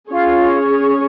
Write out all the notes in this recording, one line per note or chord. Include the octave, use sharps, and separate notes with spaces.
C#4 F4 G#4 C#5